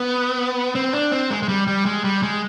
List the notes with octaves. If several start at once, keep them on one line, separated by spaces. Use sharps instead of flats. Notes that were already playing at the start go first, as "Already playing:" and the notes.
Already playing: B3
C4
D4
C4
G#3
G#3
G3
G3
G#3
G3
G#3